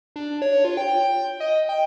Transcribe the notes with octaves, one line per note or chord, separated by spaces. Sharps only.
D4
C#5
F4
G5
D#5
G5